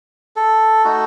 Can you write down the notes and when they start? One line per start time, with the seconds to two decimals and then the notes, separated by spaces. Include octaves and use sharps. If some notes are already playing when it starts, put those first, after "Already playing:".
0.36 A4
0.84 A3 D#4 F#4